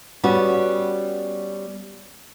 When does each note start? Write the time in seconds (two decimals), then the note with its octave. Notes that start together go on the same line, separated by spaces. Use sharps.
0.24 G3 B3 C#4 F#4